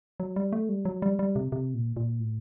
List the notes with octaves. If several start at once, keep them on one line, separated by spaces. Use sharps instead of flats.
F#3
G3
A3
G3
F#3
G3
G3
C3
C3
A#2
A#2
A2